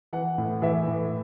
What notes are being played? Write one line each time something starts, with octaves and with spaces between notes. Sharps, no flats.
E3 F#5
A2
E3 E5
A2